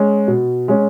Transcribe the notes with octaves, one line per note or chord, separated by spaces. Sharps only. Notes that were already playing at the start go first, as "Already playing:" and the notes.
Already playing: G#3 C#4
B2
G#3 C#4